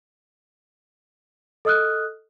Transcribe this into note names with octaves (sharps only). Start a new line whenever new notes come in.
A4 D#5 D#6 F6 F#6